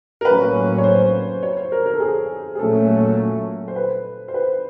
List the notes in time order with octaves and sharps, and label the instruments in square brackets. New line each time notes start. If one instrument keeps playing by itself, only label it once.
[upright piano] A#4
[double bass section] A2 F#3 A#3 C#4 [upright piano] B4
[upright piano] C#5
C5
C#5
C5
A#4
A#4
A4
G#4
G#4
[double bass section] A#2 F#3 A3 C#4 [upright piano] A4
[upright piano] C5
B4
C5
B4